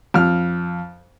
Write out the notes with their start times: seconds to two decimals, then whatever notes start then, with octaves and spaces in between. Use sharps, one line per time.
0.14 F2 F6